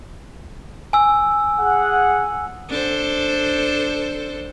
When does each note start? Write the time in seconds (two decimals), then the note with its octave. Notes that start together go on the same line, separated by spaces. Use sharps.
0.93 G#5 E6
1.59 G#4 F#5
2.69 D4 A4 C5